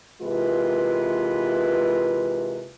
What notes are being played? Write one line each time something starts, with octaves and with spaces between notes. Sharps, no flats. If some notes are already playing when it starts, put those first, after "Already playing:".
C3 E3 G#3 A#3 F4 B4